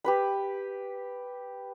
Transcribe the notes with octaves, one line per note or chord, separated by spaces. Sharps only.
G4 B4 B5